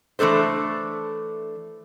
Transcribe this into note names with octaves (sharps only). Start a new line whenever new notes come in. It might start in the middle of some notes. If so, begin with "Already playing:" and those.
E3 A3 D4 A4 C5